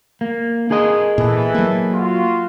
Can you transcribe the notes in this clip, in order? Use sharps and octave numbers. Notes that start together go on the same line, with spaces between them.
A#3
G#4 A#4 D#5
A#2 E3 A4
F#3 A#3
F4 F#4